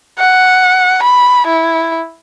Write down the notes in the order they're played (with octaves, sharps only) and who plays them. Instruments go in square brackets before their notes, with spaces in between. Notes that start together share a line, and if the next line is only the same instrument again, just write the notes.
[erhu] F#5
B5
E4